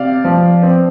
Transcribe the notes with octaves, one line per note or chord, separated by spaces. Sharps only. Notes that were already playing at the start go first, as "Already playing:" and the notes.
Already playing: C3 D5 F5
F3
C4